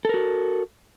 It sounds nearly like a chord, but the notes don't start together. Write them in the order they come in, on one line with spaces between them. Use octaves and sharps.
A4 A#4 F#4